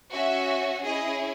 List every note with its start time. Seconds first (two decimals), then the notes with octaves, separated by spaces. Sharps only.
0.12 C#4 F#4 E5
0.85 C#4 E4 G#4 D#5